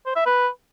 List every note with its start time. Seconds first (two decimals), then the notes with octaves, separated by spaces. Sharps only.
0.06 C5
0.16 E5
0.26 B4